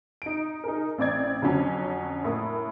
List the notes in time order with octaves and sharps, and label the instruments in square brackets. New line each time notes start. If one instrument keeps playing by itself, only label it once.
[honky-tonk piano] D#4 D7
D#4 G#4 A#4
A1 C4 D5 G#6
F2 D3 F#3 C#4
A2 A#3 D#6